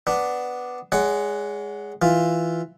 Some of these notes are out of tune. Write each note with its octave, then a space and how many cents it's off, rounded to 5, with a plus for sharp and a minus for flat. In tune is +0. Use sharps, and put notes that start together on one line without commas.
B3 +5 D4 +0
G#3 -5 C#5 +35 F#5 +5
E3 +0 F4 +0